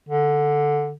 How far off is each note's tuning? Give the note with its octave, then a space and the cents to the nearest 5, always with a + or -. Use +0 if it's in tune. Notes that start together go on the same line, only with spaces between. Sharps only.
D3 +0